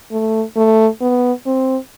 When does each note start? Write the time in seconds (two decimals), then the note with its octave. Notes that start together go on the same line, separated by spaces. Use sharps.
0.12 A3
0.56 A3
1.01 B3
1.46 C4